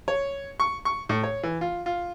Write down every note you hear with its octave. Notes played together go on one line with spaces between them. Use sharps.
C#5
C#6
C#6
A2
C#5
E3
F4
F4